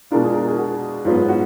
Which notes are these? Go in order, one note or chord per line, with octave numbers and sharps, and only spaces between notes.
B2 G#3 D4 F4 A#4
G#4
A#4
G#4
F#4
G#2 F#3 B3 F4
F#4